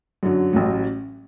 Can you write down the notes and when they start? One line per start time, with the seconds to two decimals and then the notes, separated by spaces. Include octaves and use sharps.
0.23 F#2 D3 F#3
0.53 A1 A2 F#3